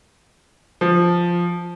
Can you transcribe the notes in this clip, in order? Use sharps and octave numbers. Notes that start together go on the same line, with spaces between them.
F3